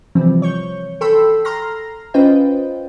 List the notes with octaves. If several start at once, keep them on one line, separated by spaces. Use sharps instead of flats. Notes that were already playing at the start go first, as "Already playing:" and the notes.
C3 E3 F3 G3 C4
C#5 C#6 G6
A4 G5 B5 C6 E6
A#5 C6 F6 A#6
C#4 F4 B4 C5 D#5 G5